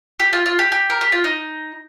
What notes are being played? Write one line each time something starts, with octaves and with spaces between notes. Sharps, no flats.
G4
F4
F4
G4
G4
A#4
G4
F4
D#4